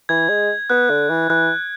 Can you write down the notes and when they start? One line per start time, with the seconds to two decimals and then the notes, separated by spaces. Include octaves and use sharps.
0.09 E3 G#6
0.29 G#3
0.69 B3 F#6
0.90 D3
1.10 E3
1.30 E3 F#6